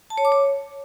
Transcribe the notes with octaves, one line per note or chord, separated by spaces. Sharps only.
A5
C#5
D6
C#5